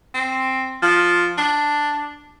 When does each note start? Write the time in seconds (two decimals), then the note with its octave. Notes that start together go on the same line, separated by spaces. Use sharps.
0.14 C4
0.82 F3
1.38 D4